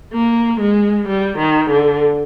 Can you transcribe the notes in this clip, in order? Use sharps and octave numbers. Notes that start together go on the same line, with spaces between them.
A#3
G#3
G3
D#3
D3